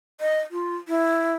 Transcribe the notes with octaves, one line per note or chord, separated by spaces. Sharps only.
D#5
F4
E4